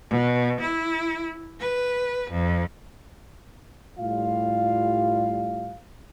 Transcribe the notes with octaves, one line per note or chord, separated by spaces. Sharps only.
B2
E4
B4
F2
A2 G3 F4 F5